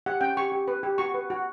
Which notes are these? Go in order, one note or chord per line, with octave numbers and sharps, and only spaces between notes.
G4 F#5
C#4 G5
G4 C#6
G4
B4
G4
F#4 C#6
B4
F#4